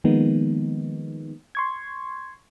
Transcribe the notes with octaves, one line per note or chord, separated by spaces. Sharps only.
D#3 F3 G#3 A#3 B3 D#4
C6 C#6 G#6